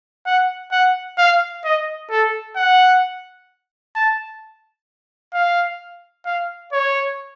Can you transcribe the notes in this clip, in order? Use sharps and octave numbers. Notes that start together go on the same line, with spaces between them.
F#5
F#5
F5
D#5
A4
F#5
A5
F5
F5
C#5